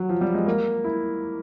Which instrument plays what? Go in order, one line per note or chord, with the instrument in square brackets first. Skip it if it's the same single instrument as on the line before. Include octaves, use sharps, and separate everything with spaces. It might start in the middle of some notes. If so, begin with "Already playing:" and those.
Already playing: [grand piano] F#3
F3
G3
G#3
A#3
E4